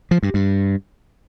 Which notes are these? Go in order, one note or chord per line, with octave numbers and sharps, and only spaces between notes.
F3
G2
G2